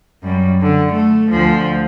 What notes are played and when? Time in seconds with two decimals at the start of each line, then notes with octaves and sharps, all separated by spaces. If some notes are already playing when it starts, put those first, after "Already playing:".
0.23 F#2 G3
0.61 D3
0.93 A3
1.30 D2 F3